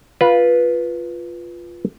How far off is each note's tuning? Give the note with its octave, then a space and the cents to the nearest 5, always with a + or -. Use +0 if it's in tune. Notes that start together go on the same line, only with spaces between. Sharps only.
F4 +0 B4 -10